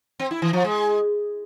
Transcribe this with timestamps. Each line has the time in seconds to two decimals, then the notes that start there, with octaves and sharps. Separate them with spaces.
0.19 C4
0.31 E4
0.42 E3
0.53 F3
0.64 G#3